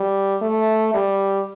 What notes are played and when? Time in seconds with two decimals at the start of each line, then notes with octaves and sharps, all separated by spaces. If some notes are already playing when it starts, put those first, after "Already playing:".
Already playing: G3
0.42 A3
0.94 G3